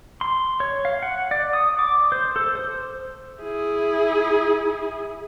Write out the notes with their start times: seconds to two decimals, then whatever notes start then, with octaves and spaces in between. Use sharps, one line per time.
0.21 C6
0.60 C#5
0.85 F5
1.03 F#5
1.31 D5
1.53 D#6
1.79 D6
2.12 C5
2.36 A4
2.55 C5
3.43 E4 G#4